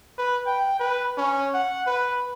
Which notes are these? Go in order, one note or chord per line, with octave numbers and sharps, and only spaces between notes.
B4
G5
B4
C#4
F#5
B4